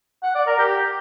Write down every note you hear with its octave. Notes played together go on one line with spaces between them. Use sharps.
F#5
D5
A#4
G4